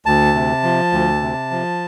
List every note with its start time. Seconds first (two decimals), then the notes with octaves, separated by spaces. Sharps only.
0.06 D2 A5
0.34 C3
0.63 F3
0.92 D2
1.22 C3
1.51 F3